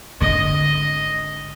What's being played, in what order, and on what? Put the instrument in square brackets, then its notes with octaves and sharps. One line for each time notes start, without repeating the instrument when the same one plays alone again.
[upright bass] G#1 D3 [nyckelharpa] D#5